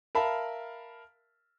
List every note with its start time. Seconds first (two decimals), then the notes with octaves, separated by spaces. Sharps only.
0.15 A#4 E5 F5 A5 B5